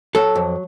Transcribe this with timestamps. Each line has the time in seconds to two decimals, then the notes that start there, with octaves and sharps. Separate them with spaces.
0.15 F#3 A4
0.36 F2